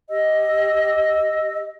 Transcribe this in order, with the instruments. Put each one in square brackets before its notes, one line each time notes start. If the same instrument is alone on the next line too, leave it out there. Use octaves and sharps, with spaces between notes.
[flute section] G4 D#5 E6